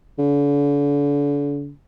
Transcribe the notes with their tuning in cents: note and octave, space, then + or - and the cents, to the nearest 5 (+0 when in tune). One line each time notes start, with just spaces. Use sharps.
D3 -40